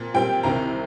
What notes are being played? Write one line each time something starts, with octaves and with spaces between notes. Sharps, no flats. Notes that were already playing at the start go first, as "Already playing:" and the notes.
Already playing: A#2 C4
A#2 G3 C4 G5
C2 C3 D#3 C4 A#5